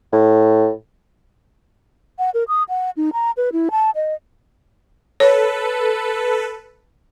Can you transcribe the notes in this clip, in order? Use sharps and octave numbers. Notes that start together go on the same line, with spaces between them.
A2
F#5
A#4
D#6
F#5
D#4
A#5
B4
E4
A5
D#5
A4 B4 C#5